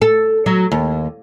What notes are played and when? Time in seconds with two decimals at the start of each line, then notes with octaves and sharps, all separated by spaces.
0.02 A4
0.46 F#3
0.72 D#2